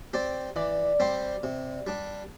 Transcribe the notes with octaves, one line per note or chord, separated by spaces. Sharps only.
C4 G4 D5
E3 D5
G3 C4 G4 C5
C3
G3 D4